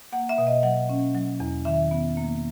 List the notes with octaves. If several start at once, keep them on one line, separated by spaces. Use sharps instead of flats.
A#3 F#5
E5
B2
D#5
F#3 F#5
C#4
F#3
E2
D#3 E5
B3
A#3